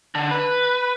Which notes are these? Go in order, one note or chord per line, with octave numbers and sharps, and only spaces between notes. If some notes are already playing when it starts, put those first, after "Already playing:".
D3
B4